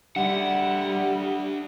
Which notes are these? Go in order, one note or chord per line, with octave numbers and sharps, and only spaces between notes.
G3 D4 E5 F#5